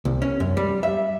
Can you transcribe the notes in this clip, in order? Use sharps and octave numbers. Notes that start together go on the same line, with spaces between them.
C2
C#4
F#2
G3
E5